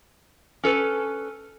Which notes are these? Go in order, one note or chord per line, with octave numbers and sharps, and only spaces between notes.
C#4 A4 B4